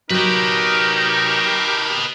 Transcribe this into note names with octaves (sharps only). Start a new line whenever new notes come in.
F#3 D#4 G4 A#4 B4 D#5